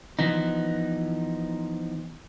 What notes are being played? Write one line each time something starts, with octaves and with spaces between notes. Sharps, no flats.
E3 F3 B3 D#4